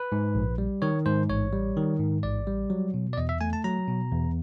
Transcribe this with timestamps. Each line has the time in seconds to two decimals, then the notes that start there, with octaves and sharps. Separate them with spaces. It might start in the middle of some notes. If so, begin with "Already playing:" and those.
Already playing: B4
0.12 G#2
0.35 A#1
0.58 G3
0.82 D#3 C#5
1.06 G#2 C5
1.29 A1 C#5
1.53 G3
1.77 D#3
2.00 G#2
2.23 A1 D5
2.47 G3
2.70 F#3
2.94 B2
3.13 D5
3.17 E2 D#5
3.29 E5
3.41 A3 G#5
3.53 A5
3.64 F#3 A#5
3.88 B2
4.12 E2